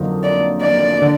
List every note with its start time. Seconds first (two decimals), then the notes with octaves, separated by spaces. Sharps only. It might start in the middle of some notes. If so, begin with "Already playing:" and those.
Already playing: F2 D3 F#3 A#3 D#4
0.23 D5
0.62 D5
1.02 D3